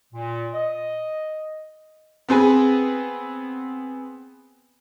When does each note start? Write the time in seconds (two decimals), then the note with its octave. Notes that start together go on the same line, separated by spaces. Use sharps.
0.13 A#2
0.54 D#5
2.29 B3 C4 G#4 B4